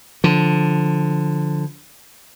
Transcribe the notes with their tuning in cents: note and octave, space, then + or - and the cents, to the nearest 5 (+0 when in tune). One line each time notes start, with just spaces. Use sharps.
D3 +0 F3 +0